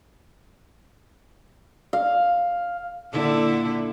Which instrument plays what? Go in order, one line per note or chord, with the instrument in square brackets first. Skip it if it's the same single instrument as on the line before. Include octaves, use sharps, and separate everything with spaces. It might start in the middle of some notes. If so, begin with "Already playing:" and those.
[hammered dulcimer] F5
[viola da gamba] A#2 D3 E4